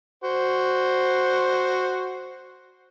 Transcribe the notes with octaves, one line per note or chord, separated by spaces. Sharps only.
F#4 C5